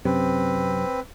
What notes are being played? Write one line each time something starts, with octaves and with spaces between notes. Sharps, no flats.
F#2 C3 C4 B4